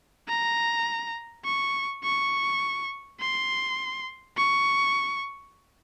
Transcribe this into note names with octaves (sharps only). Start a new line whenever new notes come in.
A#5
C#6
C#6
C6
C#6